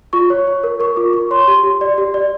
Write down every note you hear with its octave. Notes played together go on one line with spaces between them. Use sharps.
F4 C#6
C#5
C#5
A#4
A#4 C#6
F4 D6
F4 C#6
C#5 C6
G4 C6
G4
D5
G4
D5